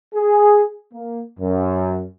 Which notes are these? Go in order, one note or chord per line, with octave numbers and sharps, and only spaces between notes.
G#4
A#3
F#2